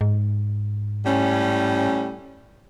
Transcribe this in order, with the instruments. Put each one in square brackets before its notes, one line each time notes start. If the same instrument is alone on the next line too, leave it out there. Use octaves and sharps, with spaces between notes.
[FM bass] G#2
[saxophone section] A2 G3 C#4